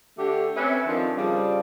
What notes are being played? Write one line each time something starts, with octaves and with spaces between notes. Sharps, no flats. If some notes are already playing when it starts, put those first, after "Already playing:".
D3 A3 G4
C4 C#4 B4 E5
F2 D#3 F3 D4
C#3 F3 G3